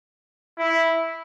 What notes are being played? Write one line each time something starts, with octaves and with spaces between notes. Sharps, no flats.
E4